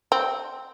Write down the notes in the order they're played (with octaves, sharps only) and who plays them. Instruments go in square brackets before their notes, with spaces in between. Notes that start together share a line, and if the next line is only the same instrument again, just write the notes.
[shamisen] C4